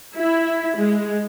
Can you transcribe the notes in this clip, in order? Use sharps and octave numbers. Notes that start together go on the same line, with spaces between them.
E4
G#3